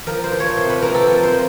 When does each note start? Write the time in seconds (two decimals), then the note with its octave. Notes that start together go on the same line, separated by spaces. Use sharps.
0.06 F3 A#4
0.24 C5
0.32 F3
0.40 C#5
0.57 C3 C5
0.69 B4
0.81 C3 A#4
0.95 A4
1.07 F3 A#4
1.23 C5
1.32 F3